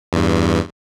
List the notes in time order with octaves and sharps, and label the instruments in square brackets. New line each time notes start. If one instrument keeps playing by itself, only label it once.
[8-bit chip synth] E2 G2